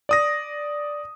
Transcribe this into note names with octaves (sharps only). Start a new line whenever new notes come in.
D5 D#6 A#6